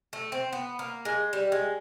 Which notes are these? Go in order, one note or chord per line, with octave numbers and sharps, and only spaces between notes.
A3
C4
B3
A#3
G#3
G3
G#3